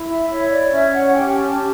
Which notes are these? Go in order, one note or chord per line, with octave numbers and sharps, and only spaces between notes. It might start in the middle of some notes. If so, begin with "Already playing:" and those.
Already playing: E4
E5
C#5 E5
D5
C#4 E5
F#5
G4 G5
G5
A5
C#4